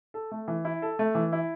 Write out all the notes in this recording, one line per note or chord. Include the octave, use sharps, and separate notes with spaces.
A4
A3
E3
E4
A4
A3
E3
E4